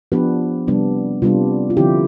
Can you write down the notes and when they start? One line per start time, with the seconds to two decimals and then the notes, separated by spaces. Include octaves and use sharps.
0.12 F3 B3 D4 G4 B4
0.68 C3 G3 B3 D4
1.22 C3 G3 B3 D4 F4
1.70 F4
1.77 D3 F3 C4 E4 G4